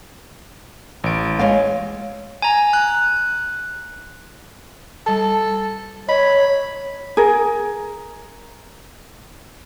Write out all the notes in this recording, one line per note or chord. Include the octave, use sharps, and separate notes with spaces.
A1 D7
G#3 C#5 F5
G#5 A#5
F#6
G3 A4 A5
C#5 D#5 B5
G#4 A#4